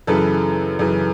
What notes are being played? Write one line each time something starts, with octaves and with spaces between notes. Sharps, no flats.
F#2 C#3 E3 A4 B4
F#2 C#3 E3